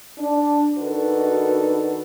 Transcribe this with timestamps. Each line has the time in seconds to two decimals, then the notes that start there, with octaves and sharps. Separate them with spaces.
0.18 D4
0.78 D#3 D4 D#4 F#4 A4 B4